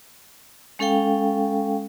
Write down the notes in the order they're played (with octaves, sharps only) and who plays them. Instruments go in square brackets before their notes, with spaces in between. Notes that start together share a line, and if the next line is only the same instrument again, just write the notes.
[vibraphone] G#3 C#4 A4 F5 G5